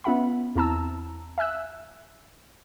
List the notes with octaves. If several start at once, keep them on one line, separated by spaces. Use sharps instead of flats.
B3 C#4 F4 E5 F#5 B5
E2 C4 E4 A5 A#5 E6
E5 G#5 E6 F#6